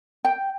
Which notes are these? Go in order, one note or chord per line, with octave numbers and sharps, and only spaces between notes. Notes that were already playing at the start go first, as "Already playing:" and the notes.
G5